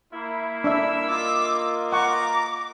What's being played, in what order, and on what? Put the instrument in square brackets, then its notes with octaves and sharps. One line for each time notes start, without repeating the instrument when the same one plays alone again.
[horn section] A#3 E4
[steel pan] D4 E5 [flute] E6
[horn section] A#3 F4 D#5 [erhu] D6
[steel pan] F#5 C#6 [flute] A#5 [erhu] D6